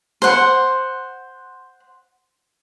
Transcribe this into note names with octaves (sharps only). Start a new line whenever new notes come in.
C5 F#5